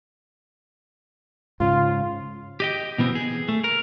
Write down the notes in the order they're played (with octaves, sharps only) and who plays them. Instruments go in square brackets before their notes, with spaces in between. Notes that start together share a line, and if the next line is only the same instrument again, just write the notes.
[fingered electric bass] G#2 C#3 [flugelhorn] F4
[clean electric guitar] G4 D#5 G5
B2 E3 B3 C4
G#4
A3
A#4